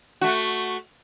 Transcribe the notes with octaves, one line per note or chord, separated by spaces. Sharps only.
A3 F#4